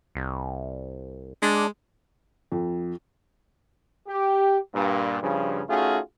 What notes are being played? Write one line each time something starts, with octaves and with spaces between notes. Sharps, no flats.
C2
G#3 D4
F2
G4
G2 A#2
G2 C#3 F3
A3 C#4 D#4 F4 F#4 G#4